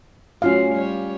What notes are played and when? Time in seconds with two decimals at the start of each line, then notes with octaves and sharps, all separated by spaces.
0.42 A2 F#3 C#4 F4 F#4 F5
0.71 G3 C#5